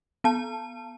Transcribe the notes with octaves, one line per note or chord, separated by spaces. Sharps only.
B3 A5